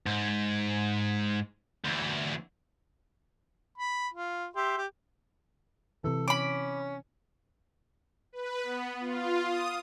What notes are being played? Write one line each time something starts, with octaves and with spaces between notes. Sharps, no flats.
G#2
D2 E3
B5
F4
G4 E5 C6
G4
C3 E3 A4
C#4 B5 D6
B4
B3
F4
D#6